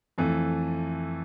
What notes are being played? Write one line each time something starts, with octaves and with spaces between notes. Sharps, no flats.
F2 E3 A3